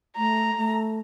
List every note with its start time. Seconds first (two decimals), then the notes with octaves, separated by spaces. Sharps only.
0.17 A3 A#5
0.57 A3